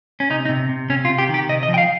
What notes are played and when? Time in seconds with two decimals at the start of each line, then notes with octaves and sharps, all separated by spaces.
0.20 C#4
0.30 C3 D#4
0.45 D#4
0.49 C3
0.69 C3
0.90 C3 C#4
1.05 F4
1.10 C3
1.18 G4
1.29 D#3
1.34 G4
1.49 C3 D#5
1.63 D#5
1.68 F3
1.74 G5
1.78 F5